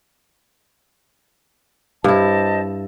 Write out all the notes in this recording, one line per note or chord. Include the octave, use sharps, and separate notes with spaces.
G2 E4 C5 D#5 A5